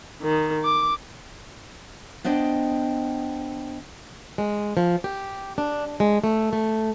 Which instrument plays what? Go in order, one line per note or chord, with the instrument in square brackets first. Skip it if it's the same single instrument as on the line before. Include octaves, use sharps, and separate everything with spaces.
[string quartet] D#3
D6
[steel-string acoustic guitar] B3 D4 C5 D#5 G5
G#3
F3
G4
D4
G#3
A3
A3